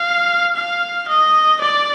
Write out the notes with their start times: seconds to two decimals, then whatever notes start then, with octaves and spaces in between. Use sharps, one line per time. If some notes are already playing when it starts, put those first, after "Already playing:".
Already playing: F5
0.56 F5
1.08 D#5
1.61 D5